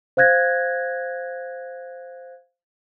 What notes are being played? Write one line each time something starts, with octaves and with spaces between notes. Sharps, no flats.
C5 F5 F#6 G#6 A#6